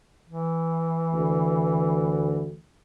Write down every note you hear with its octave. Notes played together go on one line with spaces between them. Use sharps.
E3
D2